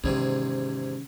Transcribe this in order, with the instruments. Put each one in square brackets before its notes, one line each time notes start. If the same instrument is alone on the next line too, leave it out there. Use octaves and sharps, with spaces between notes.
[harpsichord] E2 G#2 C3 [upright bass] D#3 C#4